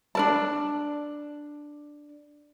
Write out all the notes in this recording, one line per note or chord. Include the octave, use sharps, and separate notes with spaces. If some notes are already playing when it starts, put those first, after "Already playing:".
D4 A#4 A5